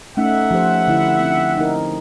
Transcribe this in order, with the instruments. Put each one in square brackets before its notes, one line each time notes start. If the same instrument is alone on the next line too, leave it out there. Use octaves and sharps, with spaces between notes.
[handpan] A3 C#4 D#4 [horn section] E5 F#5
[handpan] F3 G4 C5
D3 E4
C4
D#4 A#4